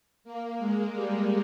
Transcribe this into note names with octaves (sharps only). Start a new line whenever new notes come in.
A#3
G#3
G3